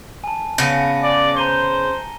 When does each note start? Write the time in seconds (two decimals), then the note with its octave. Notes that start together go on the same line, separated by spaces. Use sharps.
0.24 G#5 A5
0.58 C#3 B3 A#6 C#7 D#7
1.03 D5
1.37 C5 A#5 D#7 G7